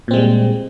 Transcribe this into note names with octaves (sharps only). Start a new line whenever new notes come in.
A#2 G3 G#3 C4